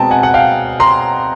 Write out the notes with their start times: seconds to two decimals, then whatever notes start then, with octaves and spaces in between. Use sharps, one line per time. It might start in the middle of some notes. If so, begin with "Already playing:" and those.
Already playing: B2 G#3 C4 G5 A5 A#5
0.11 F#5 G#5
0.23 F#5
0.34 F5 G5
0.80 A#5 C6